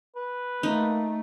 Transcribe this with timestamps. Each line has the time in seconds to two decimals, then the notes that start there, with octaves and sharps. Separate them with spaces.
0.16 B4
0.63 A3 A#3 D#4